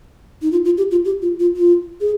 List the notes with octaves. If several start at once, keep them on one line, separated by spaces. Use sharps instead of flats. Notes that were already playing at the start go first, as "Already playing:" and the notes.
D#4
F4
F4
G4
F4
G4
F4
F4
F4
G#4